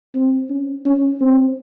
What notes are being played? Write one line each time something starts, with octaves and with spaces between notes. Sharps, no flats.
C4
C#4
C#4
C4